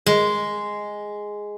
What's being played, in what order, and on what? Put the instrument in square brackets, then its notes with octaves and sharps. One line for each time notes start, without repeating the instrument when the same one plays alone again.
[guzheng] G#3